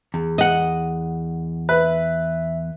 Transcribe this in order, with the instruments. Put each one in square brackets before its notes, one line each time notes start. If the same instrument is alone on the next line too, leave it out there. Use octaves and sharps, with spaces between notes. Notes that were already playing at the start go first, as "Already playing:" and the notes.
[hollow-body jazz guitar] E2
[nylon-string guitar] D#5 F#5
[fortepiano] B4 [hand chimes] E5